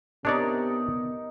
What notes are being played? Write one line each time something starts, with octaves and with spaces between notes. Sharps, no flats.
C3 B3 D4 D#4 A#4 C#5 D5